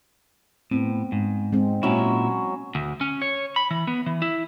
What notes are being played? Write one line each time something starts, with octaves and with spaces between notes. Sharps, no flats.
A2 B3 C4
G#2
G#3 C4
A#2 F#3 C#4 E4
D2
C#4
C#5
B5
E3
B3
E3
E4